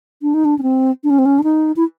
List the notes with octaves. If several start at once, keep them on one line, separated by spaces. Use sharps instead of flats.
D4
D#4
D4
C#4
C4
D4
C#4
C4
C#4
D4
D#4
E4